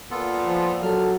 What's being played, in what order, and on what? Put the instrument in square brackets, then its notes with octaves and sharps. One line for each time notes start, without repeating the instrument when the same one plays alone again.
[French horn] A#2 [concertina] B3 F4 A4
[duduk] F3
[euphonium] F#3 [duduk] A4 [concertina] F6